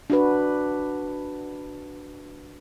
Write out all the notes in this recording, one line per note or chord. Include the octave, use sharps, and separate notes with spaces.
D4 F#4 B4